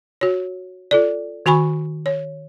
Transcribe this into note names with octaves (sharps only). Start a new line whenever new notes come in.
F#4 C#5
F4 A4 D5
D#3 F#4 G#5 B5 C#6
C#5